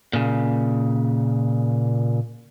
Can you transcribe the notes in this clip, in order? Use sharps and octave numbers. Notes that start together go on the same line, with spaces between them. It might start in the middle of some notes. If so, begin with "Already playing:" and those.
A#2 C#3